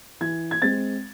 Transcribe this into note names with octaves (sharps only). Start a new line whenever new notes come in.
E3 G#6
G#6
G#3 C4 A6